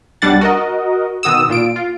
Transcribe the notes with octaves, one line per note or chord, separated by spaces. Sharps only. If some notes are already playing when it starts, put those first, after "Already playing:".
B1 G3 D4 F#5 A6
F#4 A#4 D#5
B2 D#3 F#4 D#6 E6
A#2 F4 D7
F4